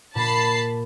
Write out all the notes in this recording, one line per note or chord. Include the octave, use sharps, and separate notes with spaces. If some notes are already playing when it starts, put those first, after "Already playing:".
A#2 A5 B5 C7